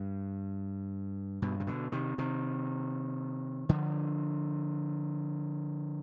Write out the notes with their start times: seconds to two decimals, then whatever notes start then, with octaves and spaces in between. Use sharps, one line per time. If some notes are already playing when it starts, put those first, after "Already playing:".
Already playing: G2
1.42 G2 B2
1.60 C3
1.67 B2 D3
1.92 C3 D#3
2.18 C3 D#3
3.69 D3 F3